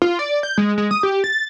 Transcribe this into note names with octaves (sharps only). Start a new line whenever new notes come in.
F4
D5
G6
G#3
G#3
D#6
G4
A6